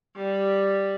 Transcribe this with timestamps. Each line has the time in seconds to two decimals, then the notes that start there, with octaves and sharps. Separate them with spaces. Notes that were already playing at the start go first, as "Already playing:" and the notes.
0.16 G3